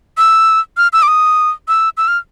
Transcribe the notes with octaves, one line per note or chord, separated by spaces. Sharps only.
E6
F6
E6
D6
D#6
E6
E6
F6